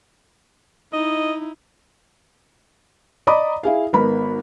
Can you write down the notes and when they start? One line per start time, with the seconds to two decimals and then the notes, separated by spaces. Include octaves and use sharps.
0.93 D#4 E4 D#5
3.27 D5 D#5 A#5 B5 D6 D#6
3.63 E4 G#4 F5
3.93 G#1 B3 D#4 A#4 B5